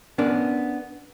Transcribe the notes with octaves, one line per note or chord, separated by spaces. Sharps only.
B3 C#4 D4 A#4 D5